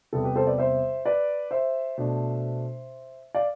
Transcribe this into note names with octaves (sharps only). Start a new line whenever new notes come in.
E2 C3 G3 B3 A4
G4 B4
A4 C5
B4 D5
C5 E5
B4 D5
C5 E5
B2 A3 D4
D5 F5